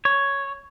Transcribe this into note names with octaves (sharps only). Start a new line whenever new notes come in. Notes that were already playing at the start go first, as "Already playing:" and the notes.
C#5